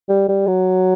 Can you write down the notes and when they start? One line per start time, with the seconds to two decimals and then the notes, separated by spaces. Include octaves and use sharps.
0.09 G3
0.28 G3
0.48 F#3